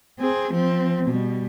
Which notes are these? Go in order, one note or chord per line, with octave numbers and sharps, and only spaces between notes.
C4 G#4
F3 C4
B2 G3